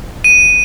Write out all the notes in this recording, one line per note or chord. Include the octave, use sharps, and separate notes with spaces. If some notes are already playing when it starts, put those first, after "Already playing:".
D#7